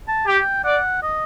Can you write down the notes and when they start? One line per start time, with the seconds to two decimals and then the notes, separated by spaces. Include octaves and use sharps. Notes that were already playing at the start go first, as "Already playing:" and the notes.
0.08 A5
0.27 G4 G5
0.64 D5 F#5
1.03 D#5